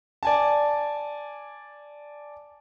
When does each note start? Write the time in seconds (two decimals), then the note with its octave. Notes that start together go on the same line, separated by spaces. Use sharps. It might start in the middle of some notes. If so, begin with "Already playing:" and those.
0.23 D5 G#5 A5